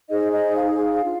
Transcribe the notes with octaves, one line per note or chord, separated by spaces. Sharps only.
D#4 G#4 C5 D#5
D#5
F5
D4 F4